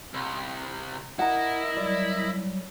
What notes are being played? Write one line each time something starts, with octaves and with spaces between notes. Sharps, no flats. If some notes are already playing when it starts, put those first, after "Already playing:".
C2
E4 A#4 D#5 F#5 A#5
F#3 G3 D5